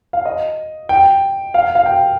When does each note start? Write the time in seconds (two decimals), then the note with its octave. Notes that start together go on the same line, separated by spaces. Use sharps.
0.13 F5
0.25 D#5
0.89 G5
1.54 F5
1.75 F5
1.86 G5